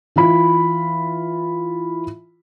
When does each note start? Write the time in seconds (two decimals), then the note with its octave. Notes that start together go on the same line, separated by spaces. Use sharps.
0.16 E3 F4 B5